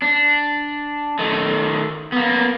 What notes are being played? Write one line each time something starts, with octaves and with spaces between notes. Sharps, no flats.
D4
D#3 A3
A#3 B3